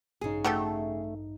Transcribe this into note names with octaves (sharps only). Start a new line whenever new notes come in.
A1 G2 C#3 D#4 G#4
A3 F#4 G4 A4